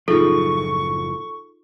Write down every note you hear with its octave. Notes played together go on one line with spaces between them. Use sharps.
F#1 A2 F3 D#4 F4 G#4 A4 C#6